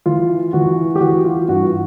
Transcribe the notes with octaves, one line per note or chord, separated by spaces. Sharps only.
E3 F4
E3 F#4
G4
E3 F#4
F4
G2 F#4